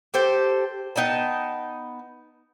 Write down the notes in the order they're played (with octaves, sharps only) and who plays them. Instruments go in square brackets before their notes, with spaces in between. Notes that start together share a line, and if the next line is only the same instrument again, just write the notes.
[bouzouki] G4 A4 C5 G5
B3 D#4 G5 A5